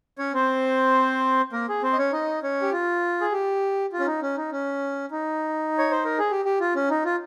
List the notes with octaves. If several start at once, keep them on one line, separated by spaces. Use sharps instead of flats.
C#4 C#5
C4 C5
A#3 A#4
G#4
C4 C5
D#5
C#4 C#5
D#4 D#5
C#4 C#5
G4
F4
G#4
G4
F4
C#4
D#4
C#4
D#4
C#4
D#4
C#5
C5
A#4
G#4
G4
G4
F4
C#4
D#4
F4